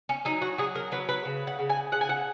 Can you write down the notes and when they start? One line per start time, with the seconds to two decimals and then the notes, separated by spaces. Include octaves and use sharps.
0.09 C#4
0.25 F#3 D#4
0.42 F#4
0.58 F#3 G#4
0.75 A#4
0.92 F#3 B4
1.09 B4
1.25 C#3
1.47 F#5
1.59 C#3
1.69 G#5
1.92 C#3 F#5
2.01 G#5
2.09 F#5